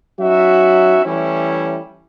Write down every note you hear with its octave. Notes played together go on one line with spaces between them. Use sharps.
F#3 C#4 D#4 F#4 E5
E3 G3 A3 C#4 E4